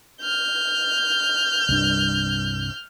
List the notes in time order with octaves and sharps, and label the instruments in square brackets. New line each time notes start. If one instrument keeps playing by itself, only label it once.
[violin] F6 G6
[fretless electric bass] C2 G2 D4